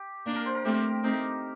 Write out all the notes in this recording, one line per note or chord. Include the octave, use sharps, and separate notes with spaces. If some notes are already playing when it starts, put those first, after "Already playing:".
Already playing: G4
A#3 D4
A#4
C5
A#4
A3 C4 G4
A3 C4 D#4